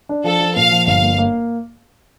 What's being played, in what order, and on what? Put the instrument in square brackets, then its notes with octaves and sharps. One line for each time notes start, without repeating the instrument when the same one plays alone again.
[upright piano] D4
[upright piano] F3 [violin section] A4
[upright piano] F3
[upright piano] A#2 [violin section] F5
[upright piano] F3
[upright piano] G1 [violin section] F5
[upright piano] A#3
A#3